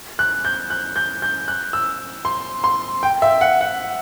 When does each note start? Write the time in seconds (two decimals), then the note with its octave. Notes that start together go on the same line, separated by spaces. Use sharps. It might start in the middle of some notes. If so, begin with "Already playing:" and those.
0.19 F#6
0.45 G6
0.70 F#6
0.96 G6
1.22 G6
1.48 F#6
1.73 E6
2.25 C6
2.64 C6
3.03 G5
3.22 E5
3.41 F#5
3.61 F#5